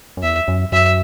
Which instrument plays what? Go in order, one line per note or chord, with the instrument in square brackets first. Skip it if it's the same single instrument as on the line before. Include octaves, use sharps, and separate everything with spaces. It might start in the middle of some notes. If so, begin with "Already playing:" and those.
[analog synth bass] F#2
[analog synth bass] E2 [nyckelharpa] E5
[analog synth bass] F#2
[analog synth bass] F#2 [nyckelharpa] E5